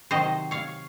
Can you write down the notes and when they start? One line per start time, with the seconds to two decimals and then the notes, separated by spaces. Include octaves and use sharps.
0.11 C3 D#3 F#3 C5 D#5
0.51 C#5 F5